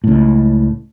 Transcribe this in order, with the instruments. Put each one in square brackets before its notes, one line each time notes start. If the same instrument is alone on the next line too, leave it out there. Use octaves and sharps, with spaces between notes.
[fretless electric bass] C#2 A2